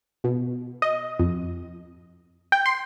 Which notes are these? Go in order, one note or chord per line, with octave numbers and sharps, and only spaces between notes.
B2
D#5
F2
G5
C6